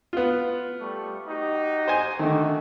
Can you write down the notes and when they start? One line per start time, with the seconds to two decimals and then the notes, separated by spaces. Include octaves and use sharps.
0.13 B3 F4
0.80 G3 A3 C#6
1.27 D#4 F#4 G4
1.88 C5 G#5
2.19 D3 D#3 A3 D#4 F#4